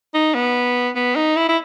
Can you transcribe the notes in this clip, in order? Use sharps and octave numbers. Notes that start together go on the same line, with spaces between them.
D#4
B3
B3
D#4
E4
E4